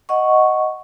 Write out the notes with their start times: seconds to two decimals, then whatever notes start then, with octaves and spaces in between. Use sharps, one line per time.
0.09 D#5 F#5 C#6